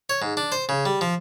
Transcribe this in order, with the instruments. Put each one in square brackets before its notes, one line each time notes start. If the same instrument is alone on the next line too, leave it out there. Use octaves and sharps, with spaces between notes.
[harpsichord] C#5
G#2
D4
C5
C#3
G3
F3